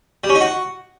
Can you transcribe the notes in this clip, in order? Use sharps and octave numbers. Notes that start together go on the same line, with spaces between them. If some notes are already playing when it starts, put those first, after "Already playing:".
G3
C#4
D#4
F#4